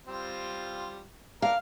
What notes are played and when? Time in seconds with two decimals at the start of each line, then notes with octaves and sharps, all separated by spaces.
0.07 G3 C4 F4
1.42 D4 A#4 F5